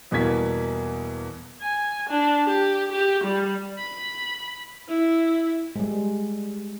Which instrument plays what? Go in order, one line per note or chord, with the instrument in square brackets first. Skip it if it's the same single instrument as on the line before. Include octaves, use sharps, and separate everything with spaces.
[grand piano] E2 B2 G3 A#3 G#6 B6
[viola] G#5
D4
G4
G4
G3
[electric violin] B5
E4
[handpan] G3 G#3